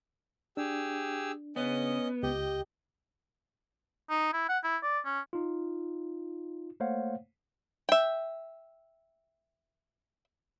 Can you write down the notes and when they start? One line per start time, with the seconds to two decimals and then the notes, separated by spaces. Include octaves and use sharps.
0.57 D4 G4 G#4 E6
1.56 C#3 B3 C#4 D#5
2.23 C#2 G4 D#5 G5
4.10 D#4
4.33 E4
4.49 F#5
4.64 E4
4.83 D5
5.05 C#4
5.33 D#4 F4
6.80 A3 A#3 C5 C#5 F5 F#5
7.89 E5 G5